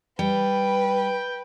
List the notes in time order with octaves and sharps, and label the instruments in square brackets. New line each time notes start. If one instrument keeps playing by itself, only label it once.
[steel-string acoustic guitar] G3 [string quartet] B4 [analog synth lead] G5